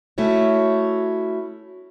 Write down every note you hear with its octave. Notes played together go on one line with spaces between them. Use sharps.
A3 C#4 E4 F#4 C#5